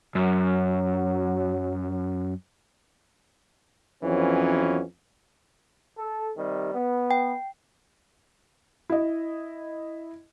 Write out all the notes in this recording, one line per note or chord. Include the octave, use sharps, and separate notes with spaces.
F#2 F#3
F2 E3 F#3 B3 C#4
A4
C3 D#3 G3
B3
G5
E4 D#5